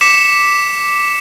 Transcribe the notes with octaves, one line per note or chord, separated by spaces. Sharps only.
D6 B6 C#7 E7